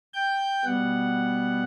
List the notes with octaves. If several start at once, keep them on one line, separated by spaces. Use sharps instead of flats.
G5 G6
B2 G3 B3 F#5